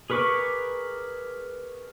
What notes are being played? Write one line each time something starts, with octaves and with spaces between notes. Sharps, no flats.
G#4 A#4 B4 C#6 D6